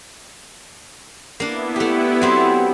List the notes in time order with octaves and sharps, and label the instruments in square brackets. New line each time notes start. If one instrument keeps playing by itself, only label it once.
[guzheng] A#3 D4 [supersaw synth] B3 E4
[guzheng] A3 G4
F#3 C4 G4